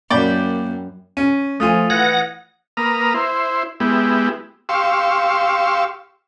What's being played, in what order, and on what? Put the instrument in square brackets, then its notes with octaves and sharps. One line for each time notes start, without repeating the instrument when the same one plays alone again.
[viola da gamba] F#2 [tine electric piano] A#3 [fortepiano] D5 [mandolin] G5 B5
[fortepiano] C#4 [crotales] D#7
[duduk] F3 [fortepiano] A3 F4 G#5 [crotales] D#6 A6 F7
[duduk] E3 [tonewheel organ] F#5 A#6 [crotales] G#6
[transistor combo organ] A#3 B4 A#5 D#6 F6
E4 C5
G#3 B3 E4 G4
G4 F5 C6 C#6 E6